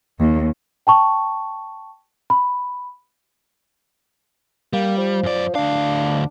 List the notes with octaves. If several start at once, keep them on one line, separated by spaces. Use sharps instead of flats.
D#2
G5 A5 C#6
B5
G3 A#3
F3
F#2 D5
D2 D4 F5